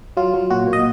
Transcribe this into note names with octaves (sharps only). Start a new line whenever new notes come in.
F#3 F4
F#3
A#2 F#4
A#2
D#5